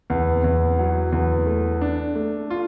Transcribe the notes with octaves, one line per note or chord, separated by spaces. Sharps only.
E2
E2
F#3
E2
A3
D4
A3
F4